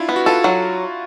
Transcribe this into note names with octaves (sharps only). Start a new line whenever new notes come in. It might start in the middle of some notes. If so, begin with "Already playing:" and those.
Already playing: D4 E4 F4
B3
F#4
F4 A4
F#3